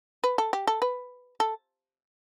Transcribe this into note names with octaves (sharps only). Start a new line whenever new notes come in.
B4
A4
G4
A4
B4
A4